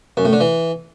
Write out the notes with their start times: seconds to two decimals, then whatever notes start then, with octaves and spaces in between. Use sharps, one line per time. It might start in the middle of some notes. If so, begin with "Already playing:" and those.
0.17 F#2
0.25 A2
0.33 D3
0.40 E3